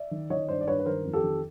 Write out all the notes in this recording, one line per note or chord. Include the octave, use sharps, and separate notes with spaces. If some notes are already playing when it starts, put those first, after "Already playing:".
Already playing: D5 E5
D#3
D#3 C#5 D#5
G2 C5 D5
D5
G2 B4 C#5
B4
D#3 A#4 C5
F2
G4 A4
D#3